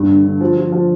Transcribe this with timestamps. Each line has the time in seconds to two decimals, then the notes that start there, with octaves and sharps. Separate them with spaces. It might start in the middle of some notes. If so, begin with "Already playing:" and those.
Already playing: G2
0.09 D3
0.25 D3
0.41 F3
0.57 F3
0.72 F3